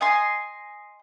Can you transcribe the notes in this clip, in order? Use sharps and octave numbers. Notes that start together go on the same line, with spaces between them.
D#5 G#5 C6